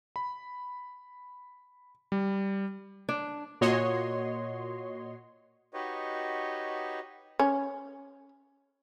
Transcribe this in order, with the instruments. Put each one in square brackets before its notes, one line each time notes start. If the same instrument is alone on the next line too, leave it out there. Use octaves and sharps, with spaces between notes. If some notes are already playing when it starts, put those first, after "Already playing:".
[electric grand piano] B5
G3
[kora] D4
[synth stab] A#2 F#4 C#5 D#5 C6
[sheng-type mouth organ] D#4 F#4 G4 B4 C#5 D#5
[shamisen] C#4